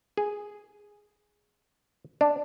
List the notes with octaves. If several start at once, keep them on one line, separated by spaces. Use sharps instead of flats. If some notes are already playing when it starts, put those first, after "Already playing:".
G#4
D4